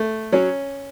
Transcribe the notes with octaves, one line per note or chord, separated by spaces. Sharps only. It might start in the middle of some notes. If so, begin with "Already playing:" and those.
Already playing: A3
F#3 C#4